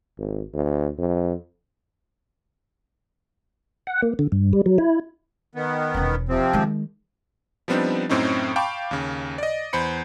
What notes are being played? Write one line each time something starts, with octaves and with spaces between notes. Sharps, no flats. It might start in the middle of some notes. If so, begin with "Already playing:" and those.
G#1
D2
F2
F#5
A#3
D3
G2
G3
F#3
E4
D#3 B3
E1 C#4
C3 F3 C4
D#3 G#3
F3 G3 B3 C4 D4 D#4
F#2 A2 C4 C#4 D#4
F5 G5 A5 B5 C#6 D6
D#2 C#3
D5 D#5
E2 C5 B5 C#7